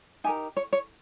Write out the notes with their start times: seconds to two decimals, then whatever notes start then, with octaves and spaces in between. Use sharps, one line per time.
0.24 D#4 G4 A#4 G#5
0.57 C#5
0.73 C#5